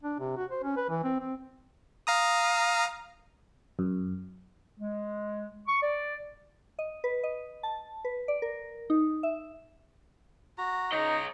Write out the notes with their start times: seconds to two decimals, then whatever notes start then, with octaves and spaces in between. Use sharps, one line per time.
0.03 D4
0.19 C3
0.37 F#4
0.51 C5
0.63 C#4
0.76 B4
0.89 E3
1.04 C4
1.20 C4
2.07 F5 A#5 D#6
3.79 F#2
4.79 G#3
5.67 C#6
5.83 D5
6.79 D#5
7.04 B4
7.24 D#5
7.63 A5
8.05 B4
8.28 D5
8.42 A#4
8.90 D#4
9.23 E5
10.58 F#4 A#5
10.92 D#4 C#5 D#5 A#5